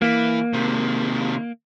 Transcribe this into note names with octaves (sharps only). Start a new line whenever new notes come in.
E3 A#3
C3 D#3